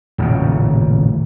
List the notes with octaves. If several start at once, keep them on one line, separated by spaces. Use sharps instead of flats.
D#1 A1 E2 C#3